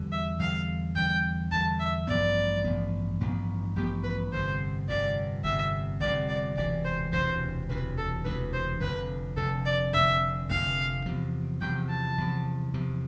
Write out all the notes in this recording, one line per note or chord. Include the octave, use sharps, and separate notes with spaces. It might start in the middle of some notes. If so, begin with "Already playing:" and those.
Already playing: E2 D3 G3
E5
E2 D3 G3 F5
E2 D3 G3 G5
E2 D3 G3 A5
E5
A1 G2 F3 B3 D5
A1 G2 F3 B3
A1 G2 F3 B3
A1 G2 F3 B3 G4
B4
G1 F2 C3 C5
G1 F2 C3 D5
G1 F2 C3 E5
G1 F2 C3 D5
D5
E1 D2 C3 E3 D5
C5
E1 D2 C3 E3 C5
E1 D2 C3 E3 B4
A4
E1 D2 C3 E3 B4
C5
F1 F2 D3 B4
F1 F2 D3 A4
D5
F1 F2 D3 E5
F1 F2 D3 F5
E2 C3 F3
E2 C3 F3 G5
A5
E2 C3 F3
E2 C3 F3